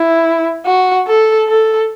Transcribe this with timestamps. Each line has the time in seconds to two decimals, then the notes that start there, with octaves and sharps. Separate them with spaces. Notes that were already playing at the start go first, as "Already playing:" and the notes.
Already playing: E4
0.66 F#4
1.07 A4
1.48 A4